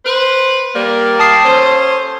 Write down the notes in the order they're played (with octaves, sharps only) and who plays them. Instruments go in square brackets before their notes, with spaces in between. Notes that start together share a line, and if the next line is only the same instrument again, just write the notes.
[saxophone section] B4 C5
G3 A#3
[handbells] A5 D#6 C7
[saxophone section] C#4 A4 C5